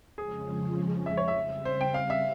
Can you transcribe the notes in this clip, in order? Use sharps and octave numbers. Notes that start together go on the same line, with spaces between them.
F2 C#3 F3 G#3 C#4 G#4
E5
C#5
E5
C#3 G3 C4
C5
G5
F5
E5